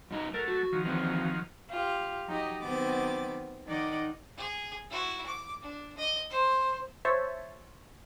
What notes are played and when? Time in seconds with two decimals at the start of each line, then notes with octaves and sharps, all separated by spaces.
0.11 F#2 D#4 A#5
0.34 F#3 A3 A4 A#4
0.48 F#4
0.72 D#3 F3 F#3
0.85 E3 C4
1.70 F4 G4
2.27 F#3 D#4 G4 D#5
2.61 D#3 F#3 B3 C4 D6 A6
3.66 D#3 D#4 D5 F#5 D6
4.37 G#4
4.90 E4 F#4
5.26 D6
5.62 D4
5.97 D#5
6.30 C5
7.05 C5 C#5 E5 A5